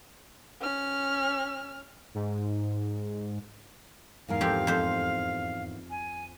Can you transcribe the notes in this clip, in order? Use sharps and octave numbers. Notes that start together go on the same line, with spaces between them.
C#4 F6
G#2
E2 G#2 A#4 F5
F2 C4 G4
F2 C5
G#5